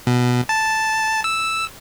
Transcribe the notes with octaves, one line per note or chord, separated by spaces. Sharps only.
B2
A5
E6